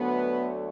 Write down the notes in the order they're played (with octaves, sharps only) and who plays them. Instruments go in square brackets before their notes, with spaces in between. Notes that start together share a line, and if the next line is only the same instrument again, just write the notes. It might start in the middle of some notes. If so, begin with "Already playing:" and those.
Already playing: [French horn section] D2 D3 F#3 A3 B3